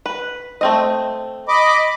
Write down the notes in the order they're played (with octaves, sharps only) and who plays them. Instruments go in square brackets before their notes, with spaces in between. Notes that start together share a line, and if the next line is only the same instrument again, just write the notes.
[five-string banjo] B4
A3 C4 D#5
[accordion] D#5 B5 D6